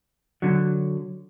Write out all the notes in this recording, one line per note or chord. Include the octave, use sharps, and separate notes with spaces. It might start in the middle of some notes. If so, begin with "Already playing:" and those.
D3 F#3